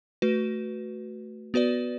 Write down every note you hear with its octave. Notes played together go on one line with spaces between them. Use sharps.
A3 F#4 B4
B3 F#4 B4 D5